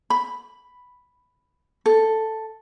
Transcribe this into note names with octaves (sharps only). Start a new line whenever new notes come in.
B5
A4